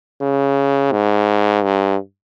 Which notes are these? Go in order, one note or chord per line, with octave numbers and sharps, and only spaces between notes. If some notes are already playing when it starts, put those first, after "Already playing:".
C#3
G#2
G2